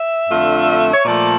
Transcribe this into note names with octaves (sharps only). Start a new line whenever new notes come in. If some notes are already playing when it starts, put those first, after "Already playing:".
Already playing: E5
F2 D3 A3 D4 F4
C#5
A#2 F3 A3 D5